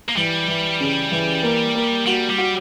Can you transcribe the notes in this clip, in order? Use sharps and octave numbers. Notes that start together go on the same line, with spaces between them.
A#3
E3 G3
E3
C#3
E3
A#3
A#3
G3 F#4
G3
F#4